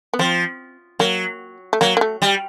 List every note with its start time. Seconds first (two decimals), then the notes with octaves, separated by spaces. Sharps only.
0.13 B3
0.19 F3 C4
0.99 F#3 A#3
1.73 A3
1.81 F#3 A#3
1.97 A#3
2.01 A3
2.22 G3